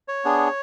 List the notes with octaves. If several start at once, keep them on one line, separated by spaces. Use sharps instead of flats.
C#5
B3 D4 G#4